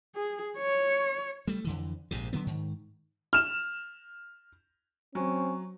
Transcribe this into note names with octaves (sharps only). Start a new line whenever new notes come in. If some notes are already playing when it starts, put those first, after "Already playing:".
G#4
C#5
G3 A3
F2 D3 E3
A#1 G#2 C3
D3 F#3 B3
G#2 D#3
F6 E7
F#3 C4 C#4